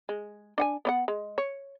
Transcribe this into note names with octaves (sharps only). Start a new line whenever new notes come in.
G#3
D4 F#5 G#5
B3 D5 F#5
G#3
C#5